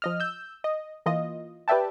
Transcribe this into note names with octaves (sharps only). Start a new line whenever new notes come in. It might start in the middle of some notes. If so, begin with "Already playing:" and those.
F3 D#5 F6
E6 G6
D#5
E3 A#3 F4 D#5
G4 B4 D5 E5 G5 A5